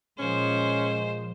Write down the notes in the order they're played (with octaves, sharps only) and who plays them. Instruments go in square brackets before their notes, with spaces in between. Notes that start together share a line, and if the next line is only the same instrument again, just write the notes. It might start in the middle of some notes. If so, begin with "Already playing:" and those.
[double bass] A#2 F3 [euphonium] G#3 [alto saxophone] C#4 [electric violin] C5